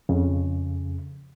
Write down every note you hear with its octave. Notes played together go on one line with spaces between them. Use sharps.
F2 C#3